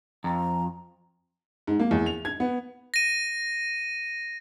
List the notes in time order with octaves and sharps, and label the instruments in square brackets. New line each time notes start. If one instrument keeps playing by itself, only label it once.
[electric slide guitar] F2 [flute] A#5
[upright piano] G#2
A#3
E2
F7
G#6
B3
[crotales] A#6 D#7